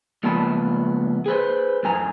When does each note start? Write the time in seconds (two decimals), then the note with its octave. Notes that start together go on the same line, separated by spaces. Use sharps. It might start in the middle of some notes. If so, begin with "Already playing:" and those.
0.23 C#2 F3 A#3 B3 A5 B5
1.26 G#4 B4 C5
1.83 F#2 A2 G#5 A#5